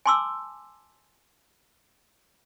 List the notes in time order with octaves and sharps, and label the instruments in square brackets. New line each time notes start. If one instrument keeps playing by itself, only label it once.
[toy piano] G#5 A5 C6 D6 E6